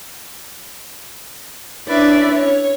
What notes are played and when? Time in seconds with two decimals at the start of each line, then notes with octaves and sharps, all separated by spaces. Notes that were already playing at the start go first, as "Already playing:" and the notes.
1.87 C#4 D4 E4 B4 D5 E5
2.35 C#5